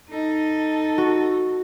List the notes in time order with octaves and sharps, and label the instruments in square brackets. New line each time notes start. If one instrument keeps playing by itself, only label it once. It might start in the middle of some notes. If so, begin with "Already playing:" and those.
[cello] D#4 [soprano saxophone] A4
[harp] F#4